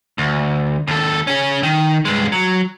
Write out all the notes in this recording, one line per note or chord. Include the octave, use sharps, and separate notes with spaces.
D2
D#2 A4
C#4 G#4
D#3
G2 G#3
F#3